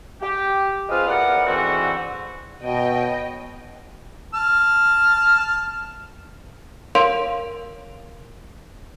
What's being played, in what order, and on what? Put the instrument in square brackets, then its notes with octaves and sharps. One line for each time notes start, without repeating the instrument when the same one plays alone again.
[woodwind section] G4
G#3 C4 F4 B4 D#6 F6
E2 B3 A#4 D5 F#5
G#2 D3 E3 C4 F#4
[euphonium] B2 [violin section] C#5 D#5 G5
[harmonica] A5 F6
[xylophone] A#4 C#5 F5 C6 D7 F7